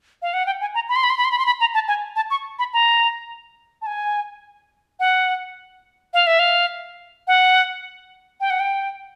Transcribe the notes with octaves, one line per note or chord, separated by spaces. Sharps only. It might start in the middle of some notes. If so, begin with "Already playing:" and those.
F5
F#5
G5
G#5
A#5
B5
C6
B5
C6
B5
C6
B5
C6
B5
A#5
A5
G#5
A5
C#6
B5
A#5
A5
G#5
F#5
F5
E5
F5
F#5
G5
F#5
G5